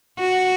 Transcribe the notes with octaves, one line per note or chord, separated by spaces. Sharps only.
F#4